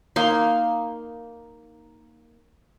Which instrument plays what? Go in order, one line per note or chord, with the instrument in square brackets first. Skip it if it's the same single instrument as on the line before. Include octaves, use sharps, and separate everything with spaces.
[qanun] A#3 D#4 C6